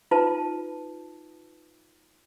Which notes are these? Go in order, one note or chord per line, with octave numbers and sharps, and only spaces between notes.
D#4 F4 B4 A5